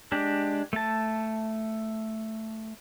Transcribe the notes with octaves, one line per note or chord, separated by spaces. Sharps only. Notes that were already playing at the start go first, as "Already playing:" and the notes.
G#3 D4 G4
A3 A5